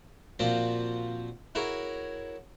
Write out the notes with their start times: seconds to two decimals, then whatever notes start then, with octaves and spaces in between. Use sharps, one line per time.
0.39 A#2 F3 C4 F4 F#4
1.55 E4 F#4 G#4 A#4 C#5